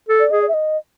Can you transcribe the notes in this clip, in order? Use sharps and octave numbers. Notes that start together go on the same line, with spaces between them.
A4
D5
G#4 D#5
D5
E5
D#5